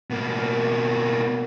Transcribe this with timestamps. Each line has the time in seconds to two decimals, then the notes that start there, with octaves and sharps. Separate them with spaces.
0.10 B2 A#3